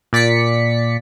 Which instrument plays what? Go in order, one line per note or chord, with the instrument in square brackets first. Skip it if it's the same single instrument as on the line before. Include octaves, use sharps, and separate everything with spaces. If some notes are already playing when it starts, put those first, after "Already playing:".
[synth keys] A#2 D5 B6 C#7